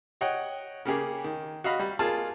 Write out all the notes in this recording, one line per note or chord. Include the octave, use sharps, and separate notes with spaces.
C#5 D#5 F#5 G5
C#3 A#3 G4 G#4
D#3
F#4 D#5 F5 B5
G3
A#3 F4 G#4 A5